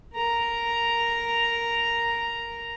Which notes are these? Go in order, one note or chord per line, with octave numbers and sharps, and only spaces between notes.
A#4 A#5